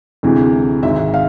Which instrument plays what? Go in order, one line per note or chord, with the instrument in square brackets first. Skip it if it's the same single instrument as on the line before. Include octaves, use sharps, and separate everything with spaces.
[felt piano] D2 C3 E3 G#3
G#1 G#2 G#3 E5
F5